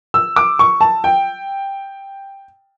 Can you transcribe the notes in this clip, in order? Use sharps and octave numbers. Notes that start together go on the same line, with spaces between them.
E6
D6
C#6
A5
G5